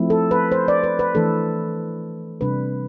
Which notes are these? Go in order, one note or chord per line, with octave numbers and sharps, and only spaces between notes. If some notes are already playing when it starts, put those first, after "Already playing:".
Already playing: F3 A3 C4 E4
A4
B4
C5
D5
B4
B4
E3 A3 D4 A4
C3 G3 D4 B4